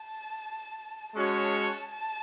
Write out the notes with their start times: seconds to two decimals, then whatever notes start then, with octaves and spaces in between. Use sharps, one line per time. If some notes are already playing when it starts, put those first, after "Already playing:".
Already playing: A5
1.14 G#3 C#4 F#4 C#5 A5
1.91 A5